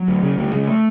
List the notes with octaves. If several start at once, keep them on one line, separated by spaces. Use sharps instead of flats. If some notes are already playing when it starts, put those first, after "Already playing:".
Already playing: F#3
D2
C#3
D2 G3
C#3 G#3
A3